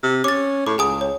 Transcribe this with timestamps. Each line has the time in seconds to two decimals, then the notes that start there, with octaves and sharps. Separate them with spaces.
0.03 C3
0.24 C#4 D6 A6
0.66 A2 D6
0.78 C#2 G#4 G#5 D#6
1.01 C#5